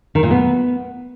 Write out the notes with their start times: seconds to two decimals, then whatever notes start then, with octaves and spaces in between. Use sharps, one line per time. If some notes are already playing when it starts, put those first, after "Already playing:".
0.15 D#3
0.23 A#2
0.31 B3